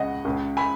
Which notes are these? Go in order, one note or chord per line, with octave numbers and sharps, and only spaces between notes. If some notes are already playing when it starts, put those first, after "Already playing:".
Already playing: C#2 C#3 G#3 D#5 F#5
C#2 C#3 G#3
G#5 B5